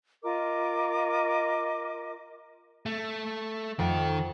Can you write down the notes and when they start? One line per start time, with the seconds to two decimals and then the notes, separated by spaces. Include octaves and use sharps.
0.23 F4 A#4 D#5 D6
2.86 A3
3.79 F2 D#3 A4 F#5 G5